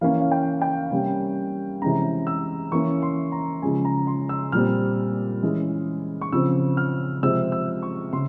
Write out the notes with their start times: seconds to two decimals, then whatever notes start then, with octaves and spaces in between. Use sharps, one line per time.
0.01 E3 A#3 C#4 F5
0.21 F5
0.32 G5
0.62 G5
0.92 C3 G3 A#3 C#4
1.82 C3 E3 G#3 C#4 A#5
2.27 E6
2.72 E3 A#3 C#4 C#6
3.02 C6
3.32 A#5
3.62 C#3 F3 G#3 C#4 G#5
3.85 A#5
4.07 C6
4.29 E6
4.52 A#2 G3 C4 F6
5.42 E3 G#3 C#4
6.21 C#6
6.32 C#3 F3 C4 E6
6.77 F6
7.23 C3 F3 G#3 C4 E6
7.52 E6
7.82 C#6
8.13 C#3 C6